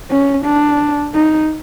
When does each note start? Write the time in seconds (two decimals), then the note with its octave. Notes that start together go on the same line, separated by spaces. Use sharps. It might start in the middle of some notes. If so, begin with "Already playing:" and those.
0.10 C#4
0.45 D4
1.14 D#4